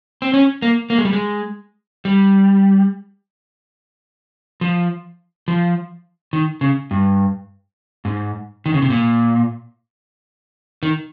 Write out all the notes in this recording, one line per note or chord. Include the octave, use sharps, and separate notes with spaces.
C4
C#4
A#3
A#3
G#3
G3
G#3
G3
F3
F3
D#3
C#3
G2
G#2
D#3
C#3
C3
A#2
D#3